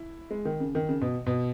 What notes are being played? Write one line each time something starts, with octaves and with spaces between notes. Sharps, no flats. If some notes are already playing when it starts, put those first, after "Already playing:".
Already playing: E4
G#3
D#3
C#3
D#3
C#3
B2
B2